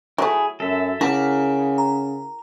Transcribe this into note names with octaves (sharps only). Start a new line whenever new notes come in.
F#3 A3 E4 G#4
F#2 A4 E5
C#3 E4 A#4 F#5 A5 D6 F6
A#5